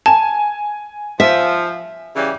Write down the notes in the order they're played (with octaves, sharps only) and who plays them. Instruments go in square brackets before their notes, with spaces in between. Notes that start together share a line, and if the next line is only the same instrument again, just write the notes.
[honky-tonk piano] G#5 [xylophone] A5
[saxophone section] F3 [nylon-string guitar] E5
[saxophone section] C#3 E3 G3